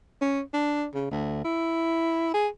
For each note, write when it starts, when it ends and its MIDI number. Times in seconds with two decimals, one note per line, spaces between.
0.22 0.41 61
0.54 0.86 62
0.95 1.11 49
1.11 1.44 38
1.44 2.33 64
2.34 2.48 68